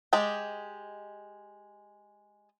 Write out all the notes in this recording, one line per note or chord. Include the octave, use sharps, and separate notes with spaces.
G#3 G4 D#5 A5